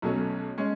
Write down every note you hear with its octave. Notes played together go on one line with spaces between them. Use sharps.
B1 B2 F#3 A3 C#4
G#3 C#4